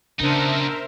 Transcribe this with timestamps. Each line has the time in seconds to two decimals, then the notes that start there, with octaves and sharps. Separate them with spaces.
0.20 C#3 B3 D4 D#4 A#4 C5 E5